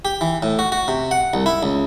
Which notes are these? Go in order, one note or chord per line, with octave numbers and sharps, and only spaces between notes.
G4
E3
A2
F#4
F#4
C3
F#5
C2
E4
C#2